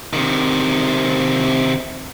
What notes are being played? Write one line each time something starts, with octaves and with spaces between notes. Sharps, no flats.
C3 D#3